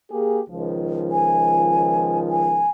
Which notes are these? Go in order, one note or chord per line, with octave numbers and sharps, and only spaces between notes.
A#3 G4 G#4
C#2 D#3 F3
G#5
G#5